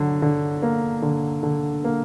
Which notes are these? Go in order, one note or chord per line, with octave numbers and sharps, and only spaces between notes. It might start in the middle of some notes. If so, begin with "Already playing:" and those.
Already playing: D3 F#3
D3
A#3
D3
D3
A#3